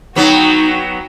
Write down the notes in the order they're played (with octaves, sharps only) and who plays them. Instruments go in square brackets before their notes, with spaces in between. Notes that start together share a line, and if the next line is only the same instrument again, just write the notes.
[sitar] F#3 B3 [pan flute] D#4 [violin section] F#4 G5